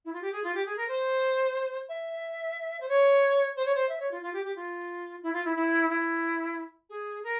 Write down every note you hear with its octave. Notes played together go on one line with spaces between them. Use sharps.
E4
F4
G4
G#4
F4
G4
G#4
A#4
C5
E5
C5
C#5
C5
C#5
C5
E5
C#5
F4
F4
G4
G4
F4
E4
F4
E4
E4
E4
G#4
A#4